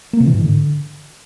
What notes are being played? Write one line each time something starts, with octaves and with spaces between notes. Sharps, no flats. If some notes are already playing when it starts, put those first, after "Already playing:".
A#3
C3
E3
G#2
D3